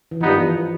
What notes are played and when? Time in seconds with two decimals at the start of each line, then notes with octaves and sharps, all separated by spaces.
0.11 E3
0.21 G2 D#3 F3 G3 B3 D#4
0.40 E3